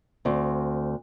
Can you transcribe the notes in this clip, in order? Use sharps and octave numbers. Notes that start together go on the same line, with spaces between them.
D2 C4